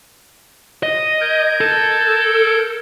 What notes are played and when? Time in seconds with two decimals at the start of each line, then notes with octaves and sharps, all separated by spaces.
0.83 D#5
1.21 A#4 G6 G#6
1.61 A4